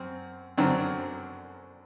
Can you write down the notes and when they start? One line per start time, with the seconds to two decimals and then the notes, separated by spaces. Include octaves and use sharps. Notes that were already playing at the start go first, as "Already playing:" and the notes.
Already playing: F#2 C4
0.58 F#2 D3 F#3 C4